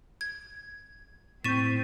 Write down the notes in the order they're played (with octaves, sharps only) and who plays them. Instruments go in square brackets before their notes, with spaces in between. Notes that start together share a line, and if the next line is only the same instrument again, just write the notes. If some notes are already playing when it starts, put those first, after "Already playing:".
[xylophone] G#6
[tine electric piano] A2 G6 [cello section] C4 [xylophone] C#6 E7 [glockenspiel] A6 B6 D#7